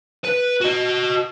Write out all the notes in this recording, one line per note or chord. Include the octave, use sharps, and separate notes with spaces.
B4
F#4 D#5